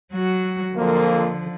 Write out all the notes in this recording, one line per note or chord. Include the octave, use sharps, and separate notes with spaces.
F#3 F#4
F2 D3 F3 A#3